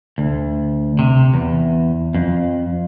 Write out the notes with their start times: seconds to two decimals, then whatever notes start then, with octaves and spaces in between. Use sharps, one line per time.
0.18 D2
0.99 C3
1.34 E2
2.14 F2